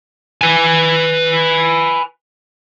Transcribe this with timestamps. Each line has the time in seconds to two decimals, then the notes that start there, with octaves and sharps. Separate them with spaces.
0.41 B4 G#5